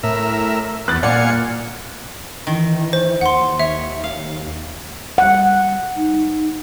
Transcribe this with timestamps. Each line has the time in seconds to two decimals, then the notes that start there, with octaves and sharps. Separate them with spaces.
0.03 A2 A#4 E5
0.88 E2 B3 F#6 A6
1.03 A#2 D5 F5 F#5 G#5 C#7
2.47 D#3 E3
2.93 C5
3.21 D#2 F#5 C6
3.60 C#5 E5
4.04 F5
5.18 G3 F#5
5.97 D#4